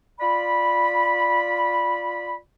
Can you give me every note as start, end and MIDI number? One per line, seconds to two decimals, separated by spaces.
0.20 2.36 65
0.20 2.36 74
0.20 2.36 83